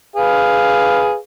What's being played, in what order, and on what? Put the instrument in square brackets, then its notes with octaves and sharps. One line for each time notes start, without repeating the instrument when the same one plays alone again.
[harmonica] G#4 B4 F5